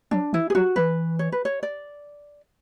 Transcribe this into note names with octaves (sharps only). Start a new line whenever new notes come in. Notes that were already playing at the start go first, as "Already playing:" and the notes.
F#3 D4
E3 E4
G#4
F#3 F#4
E3 B4
C#5
B4
C#5
D5